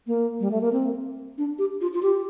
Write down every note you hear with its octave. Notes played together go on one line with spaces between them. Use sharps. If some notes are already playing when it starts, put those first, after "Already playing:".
A#3
G3
A3
A#3
C4
D4
G4
F4
F4
G4